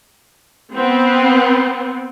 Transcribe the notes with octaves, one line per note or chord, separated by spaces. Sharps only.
B3 C4